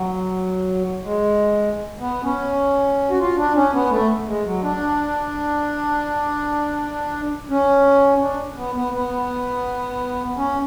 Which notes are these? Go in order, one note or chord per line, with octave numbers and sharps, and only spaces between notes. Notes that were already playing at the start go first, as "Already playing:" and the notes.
Already playing: F#3
G#3
B3
C#4
F#4
F4
D4
C#4
B3
A3
G#3
F#3
D4
C#4
D4
B3
B3
B3
C#4